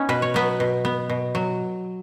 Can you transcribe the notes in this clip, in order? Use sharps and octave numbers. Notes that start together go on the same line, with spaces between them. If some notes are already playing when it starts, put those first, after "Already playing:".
Already playing: B3 C#4 D#4
B2 B4
C#5
F#3 B3 B4
B2
B3
B2
F#3